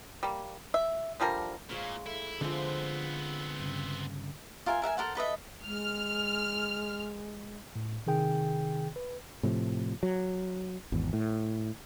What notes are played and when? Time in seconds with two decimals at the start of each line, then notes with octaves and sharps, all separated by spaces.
0.23 G3 A#3
0.74 E5
1.20 D3 F3 G3 A#4
1.70 A#2 G#3 C#5 F5
2.06 E4 A4 E5
2.41 D3 F3 G#3 B3 C4
3.60 G2 C#3
4.66 F4 A#4 E5 G#5
4.82 A#4 E5 F#5 G#5
4.97 A4 A#4 C5 F#5
5.15 A4 B4 D#5 E5
5.66 G#3 F6
7.76 A2
8.07 C3 D#3 G#4 G5
8.96 B4
9.43 A2 C3 F3
10.03 F#3
10.92 G#1 E2
11.13 A2